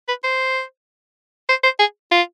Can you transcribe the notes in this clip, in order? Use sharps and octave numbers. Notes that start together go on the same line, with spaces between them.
B4
C5
C5
C5
G#4
F4